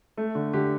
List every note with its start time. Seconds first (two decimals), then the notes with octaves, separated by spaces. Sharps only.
0.17 A3
0.35 D3
0.53 D3 G4